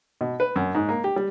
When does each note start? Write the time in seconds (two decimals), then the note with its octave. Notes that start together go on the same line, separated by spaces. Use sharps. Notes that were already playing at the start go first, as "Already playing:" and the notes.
0.21 B2
0.40 B4
0.56 F#2
0.75 G#2
0.89 A#3
1.04 G4
1.16 G3